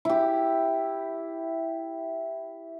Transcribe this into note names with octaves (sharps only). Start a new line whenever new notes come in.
E4 G4